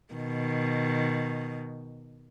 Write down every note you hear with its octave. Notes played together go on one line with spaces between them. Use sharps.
B2 D#3